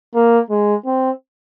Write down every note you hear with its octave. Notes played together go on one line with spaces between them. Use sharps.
A#3
G#3
C4